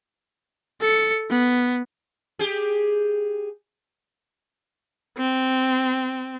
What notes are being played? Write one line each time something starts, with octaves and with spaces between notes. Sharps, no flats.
A4 C#7
B3
G4 G#4
C4